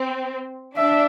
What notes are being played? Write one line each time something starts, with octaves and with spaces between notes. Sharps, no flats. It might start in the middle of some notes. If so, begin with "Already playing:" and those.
Already playing: C4
D4 E5